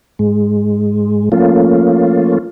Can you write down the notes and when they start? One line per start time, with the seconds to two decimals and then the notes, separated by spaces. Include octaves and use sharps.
0.19 G#2 G#3
1.32 F3 A3 A#3 C#4 F4